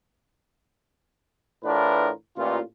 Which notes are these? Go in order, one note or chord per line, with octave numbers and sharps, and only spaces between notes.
A2 E3 D4 F4 A#4 B4
A1 A#2 F4